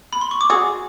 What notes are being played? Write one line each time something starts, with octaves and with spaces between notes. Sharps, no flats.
B5
C6
C#6
D6
F#4 G#4 D#6